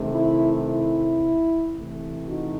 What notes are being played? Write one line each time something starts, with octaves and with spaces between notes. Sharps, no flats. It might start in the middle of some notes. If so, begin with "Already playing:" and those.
Already playing: C3 D#3 A3
E4
E4
C3 E3 A3
D#4 F#4